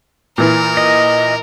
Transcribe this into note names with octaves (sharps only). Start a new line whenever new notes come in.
A#2 E3 A#4
D#5